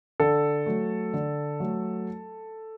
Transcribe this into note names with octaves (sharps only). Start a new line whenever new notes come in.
D3 A4
F#3 A3
D3
F#3 A3